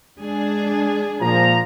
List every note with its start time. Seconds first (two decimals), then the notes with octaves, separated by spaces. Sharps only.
0.17 G#3 D4 G#4
1.21 A#2 F3 A#5